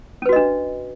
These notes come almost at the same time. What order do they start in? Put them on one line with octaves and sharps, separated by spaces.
C#4 B4 F#4 D#5 D4